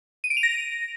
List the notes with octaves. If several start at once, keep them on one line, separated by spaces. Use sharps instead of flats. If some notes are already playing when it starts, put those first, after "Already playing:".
D#7
D7
F7
A#6